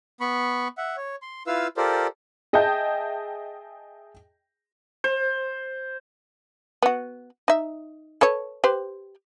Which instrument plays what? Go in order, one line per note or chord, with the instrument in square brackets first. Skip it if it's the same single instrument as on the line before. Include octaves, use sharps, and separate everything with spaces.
[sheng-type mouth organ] B3 B5 C#6
E5 F#5
C#5
C6
E4 F4 B4 F5 E6
F4 G4 A4 A#4 C5 D5
[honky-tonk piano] G#4 D#5 E5 G5 A5 G6
[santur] C5
[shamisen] B3 F#4
D#4 E5
A4 B4 C#5
G4 B4 C5